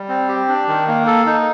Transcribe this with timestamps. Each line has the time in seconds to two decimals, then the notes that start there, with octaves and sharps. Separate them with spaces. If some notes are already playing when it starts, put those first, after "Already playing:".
Already playing: G3
0.09 C4
0.28 G4
0.48 D4
0.68 D#3
0.87 A#3
1.06 A4
1.26 D#4